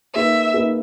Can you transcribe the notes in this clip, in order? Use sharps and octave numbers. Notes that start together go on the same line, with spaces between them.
A#3 D#4 G#4 B4 E5
A#3 D#4 G#4 B4